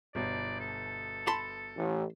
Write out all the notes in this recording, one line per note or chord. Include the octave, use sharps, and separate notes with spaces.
G1 B2 D5
A4
A5 B5 C6
A1